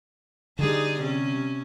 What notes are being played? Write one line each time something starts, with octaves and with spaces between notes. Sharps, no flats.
D3 G3 D#4 G#4 D5
C3 C#4